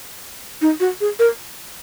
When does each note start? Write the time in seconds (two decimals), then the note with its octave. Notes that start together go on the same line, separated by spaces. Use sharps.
0.62 D#4
0.80 F#4
1.01 G#4
1.19 A#4